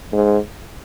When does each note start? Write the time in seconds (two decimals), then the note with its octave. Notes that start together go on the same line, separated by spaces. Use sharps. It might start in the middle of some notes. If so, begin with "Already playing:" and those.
0.13 G#2